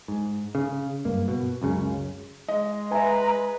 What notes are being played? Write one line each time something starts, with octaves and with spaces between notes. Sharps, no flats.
G#2
C#3
F#1 G2 A#3
B2
C#2 F#2 C#3
G#3 D#5
B4 E5 G#5 A#5